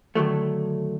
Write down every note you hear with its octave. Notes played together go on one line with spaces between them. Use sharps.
D3 D#3 F#3 A3